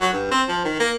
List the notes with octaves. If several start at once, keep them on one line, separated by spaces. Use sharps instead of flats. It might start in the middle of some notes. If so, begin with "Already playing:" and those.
F#3
G2
C4
F3
D#3
A#3